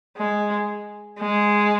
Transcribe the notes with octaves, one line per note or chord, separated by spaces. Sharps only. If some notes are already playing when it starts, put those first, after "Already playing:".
G#3
G#3